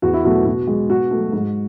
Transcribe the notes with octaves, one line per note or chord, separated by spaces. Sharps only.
E2 F#4
E4
B2 F#3 A3 F#4
B2
G#3
B2 F#4
F#3 A3
G#2